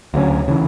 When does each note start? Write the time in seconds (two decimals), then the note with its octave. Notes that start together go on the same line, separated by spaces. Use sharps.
0.14 D2 C#3 F#3 C#4
0.48 C#3 E3